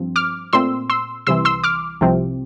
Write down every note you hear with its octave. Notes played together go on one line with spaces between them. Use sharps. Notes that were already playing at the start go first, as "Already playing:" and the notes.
Already playing: G2 F3 C4
D6 F6
A#2 A3 C4 C6 E6
C6 E6
C2 C3 E3 C6 E6
C6 E6
D6 F6
C2 C3 F3 C4